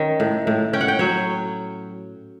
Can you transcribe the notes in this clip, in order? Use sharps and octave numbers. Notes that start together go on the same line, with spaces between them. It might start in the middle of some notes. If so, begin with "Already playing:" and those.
Already playing: D#3 C#4
A2
A2
C#4 G5
F#5
G5
F#3 C#5